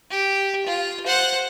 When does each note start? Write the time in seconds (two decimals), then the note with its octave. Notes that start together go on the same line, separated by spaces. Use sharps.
0.11 G4
0.66 F4
1.07 C5 F#5